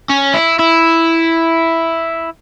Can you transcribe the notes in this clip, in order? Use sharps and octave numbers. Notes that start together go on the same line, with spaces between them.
C#4
E4
E4